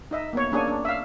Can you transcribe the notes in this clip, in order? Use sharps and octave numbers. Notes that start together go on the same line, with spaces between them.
D#4 D#5 E5
A#3 B3 C#5
A#3 C#4 D4 G#4 C#5 G#5
D4
E5 F5